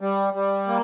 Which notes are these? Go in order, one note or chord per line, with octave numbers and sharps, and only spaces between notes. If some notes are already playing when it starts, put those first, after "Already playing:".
G3
G3
A#3